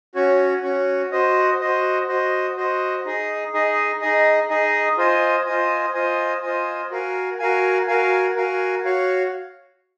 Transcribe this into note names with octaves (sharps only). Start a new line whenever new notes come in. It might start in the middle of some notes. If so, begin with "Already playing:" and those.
C#4 F#4 C#5
C#4 F#4 C#5
F#4 C5 D#5
F#4 C5 D#5
F#4 C5 D#5
F#4 C5 D#5
D#4 G#4 D#5
D#4 G#4 D#5
D#4 G#4 D#5
D#4 G#4 D#5
F4 C5 D#5 G#5
F4 C5 D#5 G#5
F4 C5 D#5 G#5
F4 C5 D#5 G#5
F#4 A#4 F5 G#5
F#4 A#4 F5 G#5
F#4 A#4 F5 G#5
F#4 A#4 F5 G#5
F#4 C#5 F5